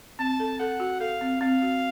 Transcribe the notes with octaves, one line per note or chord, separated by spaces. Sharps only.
C4 A5
A4
A4 F#5
F#4
A4 F5
C4
C4 F5
F#4